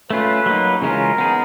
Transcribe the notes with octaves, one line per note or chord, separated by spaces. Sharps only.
A3 C#4 F4 B4
F#3 A#3 D#4
C#3 E3 G#3 C#4 F4 A#4
B3 D#4 G#4